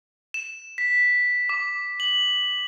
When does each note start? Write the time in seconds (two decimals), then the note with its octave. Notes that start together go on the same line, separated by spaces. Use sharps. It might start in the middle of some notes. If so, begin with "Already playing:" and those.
0.34 E7
0.78 B6
1.49 D6
2.00 F#7